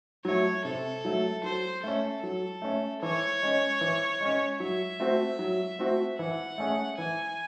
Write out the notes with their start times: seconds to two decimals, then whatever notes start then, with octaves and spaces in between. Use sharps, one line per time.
0.25 F#3 A3 C#5
0.65 C3 A4
1.05 F#3 A3
1.43 F#3 C5
1.83 A3 C#4 A4
2.22 F#3 A4
2.62 A3 C#4
3.02 E3 C#5
3.42 G#3 C#4
3.81 E3
4.21 G#3 C#4
4.60 F#3 E5
5.00 A3 C4 F#4
5.39 F#3
5.79 A3 C4 F#4
6.18 E3 F#5
6.58 A3 C#4 G#4 C#5
6.98 E3 G#5